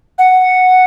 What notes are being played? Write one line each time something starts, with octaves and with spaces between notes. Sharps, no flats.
F#5